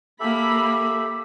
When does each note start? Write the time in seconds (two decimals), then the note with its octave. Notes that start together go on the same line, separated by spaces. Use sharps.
0.20 A#3 G4 A4 E5 B5